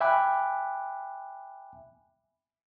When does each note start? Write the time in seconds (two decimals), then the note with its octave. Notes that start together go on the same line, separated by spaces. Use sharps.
0.01 E5 G5 G#5 B5 D6 F#6